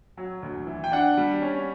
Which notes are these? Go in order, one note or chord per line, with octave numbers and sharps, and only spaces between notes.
F#3
D2
E3
G5
D4 F#5
G3
C#4